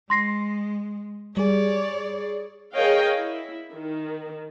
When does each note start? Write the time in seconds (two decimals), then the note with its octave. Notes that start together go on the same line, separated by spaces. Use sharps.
0.10 G#3 C6 A#6 C7
1.37 G3 G#4 C#5 D5
2.75 G#4 A#4 C#5 D#5 F5 G5
3.15 E4
3.73 D#3